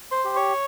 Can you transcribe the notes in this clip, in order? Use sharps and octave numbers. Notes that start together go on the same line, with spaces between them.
C5 C6
G4
C#5 C#6